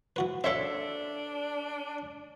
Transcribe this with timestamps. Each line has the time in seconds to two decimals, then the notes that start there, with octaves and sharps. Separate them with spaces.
0.16 E3 F#4 B4
0.44 D4 A4 C5 C#5 E5 F5